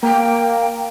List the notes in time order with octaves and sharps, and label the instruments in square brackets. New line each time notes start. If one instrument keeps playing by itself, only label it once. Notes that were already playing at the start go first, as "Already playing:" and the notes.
[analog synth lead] A#3 [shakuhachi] G5